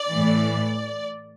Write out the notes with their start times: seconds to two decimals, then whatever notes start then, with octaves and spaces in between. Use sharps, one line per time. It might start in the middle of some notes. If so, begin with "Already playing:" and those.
Already playing: D5
0.12 A2 E3